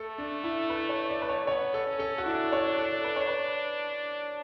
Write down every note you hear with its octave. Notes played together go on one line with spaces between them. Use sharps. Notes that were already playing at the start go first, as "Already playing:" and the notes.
Already playing: A3 A4
D4
E4
B4
C#5
D5
B4
C#5
B3 C#5
A4
C#4
A4
F#4
D4 E4
C#5
A4
B4
C#5
B4